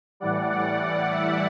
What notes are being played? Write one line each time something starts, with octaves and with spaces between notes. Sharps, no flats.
A2 E3 G3 D5 F#5
D5 F#5
E5